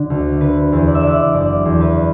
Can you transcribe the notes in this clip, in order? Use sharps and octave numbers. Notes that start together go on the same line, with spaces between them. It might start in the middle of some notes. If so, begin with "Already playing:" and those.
Already playing: D3
D2
D3 B4
E2
D5
E5
D3 D5
F#1 D5
E2
B4